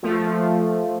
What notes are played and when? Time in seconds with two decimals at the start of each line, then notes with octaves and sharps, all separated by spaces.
0.03 F3 A3